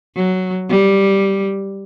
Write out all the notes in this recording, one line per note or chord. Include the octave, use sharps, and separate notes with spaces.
F#3
G3